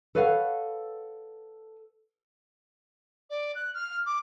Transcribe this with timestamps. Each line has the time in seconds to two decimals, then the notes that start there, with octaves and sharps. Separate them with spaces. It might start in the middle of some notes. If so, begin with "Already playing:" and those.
0.15 A4 B4 C#5 D5 F5 F#5
3.30 D5
3.55 F#6
3.74 F6
4.06 D6